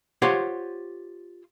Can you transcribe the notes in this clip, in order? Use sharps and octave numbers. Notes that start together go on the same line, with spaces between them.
F4 G4 C5 C#5 F#5